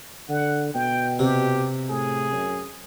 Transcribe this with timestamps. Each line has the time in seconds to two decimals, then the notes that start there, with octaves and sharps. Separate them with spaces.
0.29 D3 F#5
0.75 B2 G5
1.19 C3 G4
1.89 A2 G#4
2.31 F#2